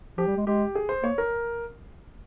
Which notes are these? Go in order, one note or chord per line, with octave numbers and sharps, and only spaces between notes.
F3 G4
G3
G#3
G#3 G4
G#4
C5
A#3 C#5
A#4